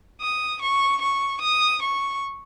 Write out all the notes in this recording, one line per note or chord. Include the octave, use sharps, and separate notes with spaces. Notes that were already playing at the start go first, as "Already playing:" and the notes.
D#6
C#6
C#6
D#6
C#6